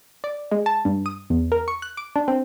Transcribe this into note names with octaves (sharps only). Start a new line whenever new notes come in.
D5
G#3
A5
G2
D#6
E2
A#4
C#6
F#6
D6
D4
C4